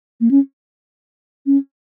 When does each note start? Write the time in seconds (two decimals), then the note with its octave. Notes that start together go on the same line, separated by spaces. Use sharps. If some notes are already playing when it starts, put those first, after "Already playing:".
0.21 A#3
0.31 C#4
1.46 C#4